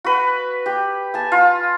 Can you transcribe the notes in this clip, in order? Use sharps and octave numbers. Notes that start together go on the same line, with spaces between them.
F#4 B4
G4
G#5 A5
F4